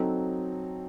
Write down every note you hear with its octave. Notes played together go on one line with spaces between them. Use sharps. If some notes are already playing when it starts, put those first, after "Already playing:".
Already playing: F#3 C4 D#4 A4